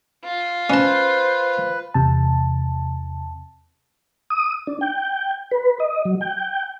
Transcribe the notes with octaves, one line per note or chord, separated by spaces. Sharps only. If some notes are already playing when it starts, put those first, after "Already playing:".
F4
C#4 B4 C5 A5
E2 C3 A5
D#6
D4
G5
B4
D#5
F#3
G5